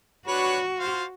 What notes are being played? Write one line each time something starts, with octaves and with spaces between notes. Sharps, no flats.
D4 F#4 B4 C#5
F4 C5 F5